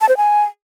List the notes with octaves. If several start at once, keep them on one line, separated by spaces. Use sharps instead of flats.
A5
C5
G#5